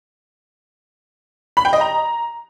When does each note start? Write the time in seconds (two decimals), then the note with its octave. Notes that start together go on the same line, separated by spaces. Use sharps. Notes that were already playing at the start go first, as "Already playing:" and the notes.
1.57 B5
1.65 G5
1.73 D#5
1.81 A#5